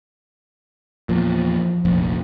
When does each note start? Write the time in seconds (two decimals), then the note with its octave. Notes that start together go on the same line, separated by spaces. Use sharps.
1.09 E2 A#2 F3
1.85 F1 A#1